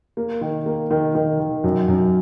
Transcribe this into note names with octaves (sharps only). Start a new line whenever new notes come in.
A#3
D#3
A#3
D#3
D#3
D#3
F#2
F#2